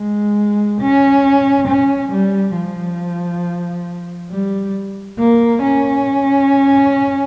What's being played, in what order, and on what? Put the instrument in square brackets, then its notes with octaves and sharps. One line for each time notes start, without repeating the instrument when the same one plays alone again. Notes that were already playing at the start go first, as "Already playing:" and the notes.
Already playing: [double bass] G#3
C#4
C#4
G3
F3
G3
A#3
C#4